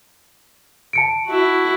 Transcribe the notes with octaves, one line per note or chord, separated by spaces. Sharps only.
A5 C#7 D7
E4 F#4